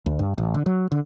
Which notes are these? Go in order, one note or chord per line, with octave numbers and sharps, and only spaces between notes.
D2
G2
A1
D3
F#3
D3